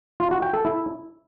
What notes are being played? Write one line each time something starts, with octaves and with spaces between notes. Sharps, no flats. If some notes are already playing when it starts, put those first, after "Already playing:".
F4
F#4
G5
A4
E4